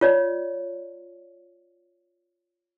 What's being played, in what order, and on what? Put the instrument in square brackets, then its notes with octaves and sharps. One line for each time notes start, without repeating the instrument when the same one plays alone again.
[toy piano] F4 C#5 D5